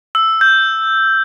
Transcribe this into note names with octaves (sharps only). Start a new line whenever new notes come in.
E6
G6